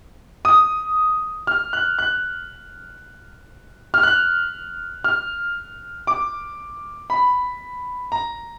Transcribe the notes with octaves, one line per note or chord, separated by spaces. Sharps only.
D#6
F6
F#6
F#6
F6
F#6
F6
D6
B5
A#5